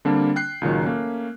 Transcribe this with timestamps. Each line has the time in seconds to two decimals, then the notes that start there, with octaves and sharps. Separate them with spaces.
0.05 D3 G3 A#3 C4 D4
0.36 G5 F#6 C7
0.61 C#2 A#2 D#3 F#3
0.85 A3 A#3 C#4